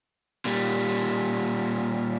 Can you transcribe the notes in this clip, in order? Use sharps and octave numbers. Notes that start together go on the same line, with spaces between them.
A#2 G3